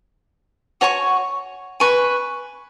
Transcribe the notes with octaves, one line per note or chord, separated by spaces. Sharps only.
F#4 C#5 G#5 C#6
B4 G#5 C#6